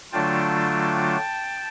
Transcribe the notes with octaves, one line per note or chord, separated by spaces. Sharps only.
D3 F#3 A3 D4 F4 G5 A5